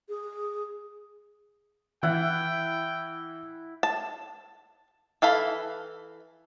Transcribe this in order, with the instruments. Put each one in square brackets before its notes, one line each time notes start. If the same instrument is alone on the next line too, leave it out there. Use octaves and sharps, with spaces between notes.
[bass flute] G#4
[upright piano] E3 [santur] E4 F#5 [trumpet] G5
[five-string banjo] A5
E3 A4 F5 B5